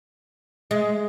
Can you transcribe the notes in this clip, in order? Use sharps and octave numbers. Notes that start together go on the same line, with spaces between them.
G#3